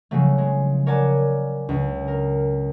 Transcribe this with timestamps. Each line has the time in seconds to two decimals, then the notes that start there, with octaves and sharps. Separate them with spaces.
0.11 C#3 F3 F#3 A3
0.38 G#3
0.86 A#4 C#5 D5 F#5 G#5 A5
1.69 C#2
2.08 A#4